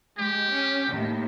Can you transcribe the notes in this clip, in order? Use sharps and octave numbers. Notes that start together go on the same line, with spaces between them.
G#3 G4
C#4
D#2 A2